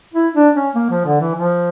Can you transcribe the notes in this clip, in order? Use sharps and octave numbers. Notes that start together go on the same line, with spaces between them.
E4
D4
C#4
A#3
F3
D3
E3
F3